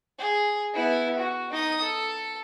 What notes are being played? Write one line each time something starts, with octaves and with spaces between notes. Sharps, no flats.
G#4
B3 E4
F#4
D#4 D#6
A4